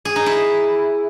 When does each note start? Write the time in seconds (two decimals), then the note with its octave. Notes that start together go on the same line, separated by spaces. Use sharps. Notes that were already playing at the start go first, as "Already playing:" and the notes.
0.05 G#4
0.16 D#4
0.26 E4